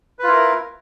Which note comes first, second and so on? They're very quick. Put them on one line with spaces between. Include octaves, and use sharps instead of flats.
B4 F4 E4 A#4